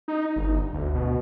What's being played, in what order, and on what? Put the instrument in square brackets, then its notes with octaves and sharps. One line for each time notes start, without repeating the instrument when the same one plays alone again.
[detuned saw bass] D#4
G1
D2
B2